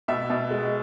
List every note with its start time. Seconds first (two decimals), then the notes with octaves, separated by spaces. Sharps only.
0.08 B2 E5
0.30 B2
0.50 G#3